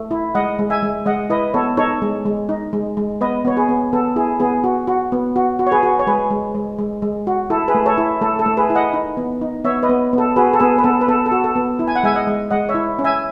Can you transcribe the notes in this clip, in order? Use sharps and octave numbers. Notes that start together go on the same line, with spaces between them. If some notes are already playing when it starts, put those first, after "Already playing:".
Already playing: A3
E4
G#3 D#5 F#5
G#3
E5 G#5
G#3
G#3 D#5 F#5
E4 B4 D#5
B3 A4 C#5
D#4 A4 C#5
G#3
G#3
D#4
G#3
G#3
B3 B4 D#5
B3 C#5
G#4 B4
B3
B3 A4
E4 G#4
B3 G#4
F#4
F#4
B3
F#4
F#4
C#5
G#4 B4
F#4
C#5
G#3 G#4 B4
G#3
G#3
G#3
G#3
F#4
E4 A4
G#4 B4
A3
A4 C#5
E4
A3 A4
A4
A3
G#4 B4
E4
D#5 F#5
D#4
B3
D#4
B3 C#5 E5
B4 D#5
B3
B3
A4
F#4 G#4 B4
A4
B3 G#4 B4
B4
B3 A4
B4
B3 A4
A4
F#4
A4
B3
E4
G#5
F#5
G#3 E5 G#5
D#5 F#5
G#3
G#3 D#5 F#5
C#5 E5
E4
C#4
E5 G#5